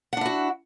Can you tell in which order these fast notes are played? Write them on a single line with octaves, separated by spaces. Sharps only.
F#5 D4 E4 F#4